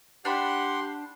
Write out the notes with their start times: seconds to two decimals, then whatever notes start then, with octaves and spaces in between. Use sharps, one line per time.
0.25 D4 G4 F#5 G5 B5 C6